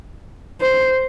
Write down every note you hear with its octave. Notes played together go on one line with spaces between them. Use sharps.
C5